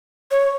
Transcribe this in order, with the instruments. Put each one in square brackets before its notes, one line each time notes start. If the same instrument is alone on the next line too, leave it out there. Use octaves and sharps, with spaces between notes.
[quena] C#5